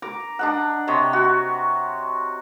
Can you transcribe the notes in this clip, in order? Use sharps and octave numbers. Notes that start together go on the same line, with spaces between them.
A#5 D6
D4 D#5 F#5
C3 C#5 D#5
F#4